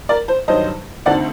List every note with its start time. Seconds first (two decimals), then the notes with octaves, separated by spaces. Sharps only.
0.09 A#4 D5
0.28 C5
0.48 G2 D#3 F#3 C5 D#5
1.06 D2 D3 A3 C4 D#4 D5 F#5